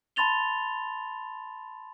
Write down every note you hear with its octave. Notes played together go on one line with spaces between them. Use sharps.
A5 B5 C6 A6 F7 G7